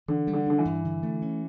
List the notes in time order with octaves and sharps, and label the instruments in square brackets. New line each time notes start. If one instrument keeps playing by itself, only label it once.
[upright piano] D3 [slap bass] E3
[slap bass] G3
[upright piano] D3
[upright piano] D3 [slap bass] D4
[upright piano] E3
[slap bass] G2
D3
A3
C#4